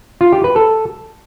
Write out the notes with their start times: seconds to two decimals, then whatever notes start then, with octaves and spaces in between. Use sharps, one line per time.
0.21 F4
0.32 G4
0.44 B4
0.56 A4